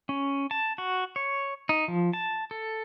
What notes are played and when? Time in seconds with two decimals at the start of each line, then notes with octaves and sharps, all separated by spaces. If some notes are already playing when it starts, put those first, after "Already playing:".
0.09 C#4
0.51 A5
0.78 F#4
1.16 C#5
1.69 D#4
1.88 F3
2.13 A5
2.51 A4